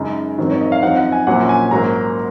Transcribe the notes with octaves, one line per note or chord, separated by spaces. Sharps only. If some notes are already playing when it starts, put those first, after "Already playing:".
Already playing: F#2 C#3 G#3 D#4
G#2 D#3 F#3 C4
C#5
D#5
F5
F#2 F3 C4 D#4 F#5
F#5
G#5
A#1 A#2 F#3 C#4 F#5
G#5
G#2 F#3 A#3 A#5